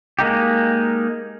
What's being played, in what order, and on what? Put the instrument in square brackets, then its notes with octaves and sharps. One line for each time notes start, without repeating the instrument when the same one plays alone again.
[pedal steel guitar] G#3 A#3 D#4 G4